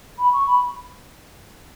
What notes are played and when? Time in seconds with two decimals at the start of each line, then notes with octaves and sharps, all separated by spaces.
0.18 B5
0.32 C#6
0.46 B5